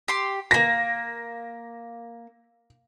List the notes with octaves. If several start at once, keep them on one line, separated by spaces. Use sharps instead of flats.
G4 C6
A#3 C4 A#6